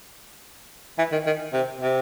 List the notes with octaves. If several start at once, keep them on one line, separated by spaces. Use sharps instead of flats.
E3
D#3
D#3
C3
C3